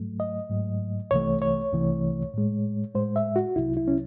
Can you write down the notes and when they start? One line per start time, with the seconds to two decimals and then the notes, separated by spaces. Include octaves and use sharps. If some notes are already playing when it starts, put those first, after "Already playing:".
Already playing: G#2 F#3 A3
0.20 D#5
0.50 G#2 F#3 A3
1.11 C2 C3 E3 A3 C#5
1.42 C#5
1.72 C2 C3 E3 A3
2.34 A2 G#3
2.95 A2 G#3 C5
3.16 E5
3.36 F#4
3.56 C2 C3 F#3 E4
3.77 E4
3.88 C#4